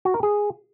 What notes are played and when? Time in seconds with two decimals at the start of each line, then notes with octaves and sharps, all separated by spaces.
0.05 F#4
0.14 A#4
0.23 G#4